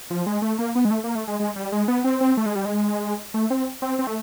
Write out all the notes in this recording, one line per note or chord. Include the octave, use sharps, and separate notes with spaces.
F3
G#3
A3
A#3
B3
G#3
A3
A#3
A3
G#3
G#3
G3
G#3
B3
C4
C4
A3
G#3
G3
G#3
A3
C4
C4
C4
A3